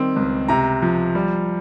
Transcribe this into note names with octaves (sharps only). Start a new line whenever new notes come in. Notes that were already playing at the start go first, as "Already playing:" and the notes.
Already playing: D#3 G3 C4
C#2
C3 A#5
F3
G3